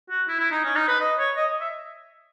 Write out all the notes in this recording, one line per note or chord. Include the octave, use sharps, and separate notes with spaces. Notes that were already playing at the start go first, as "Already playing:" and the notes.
F#4
E4
E4
D#4
C#4
D#4
B4
D#5
C#5
D#5
E5